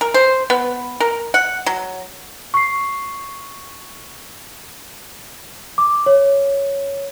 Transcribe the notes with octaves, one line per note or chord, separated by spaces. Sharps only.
A#4
C5
B3
A#4
F#5
F#3
C#6 C7
D6
C#5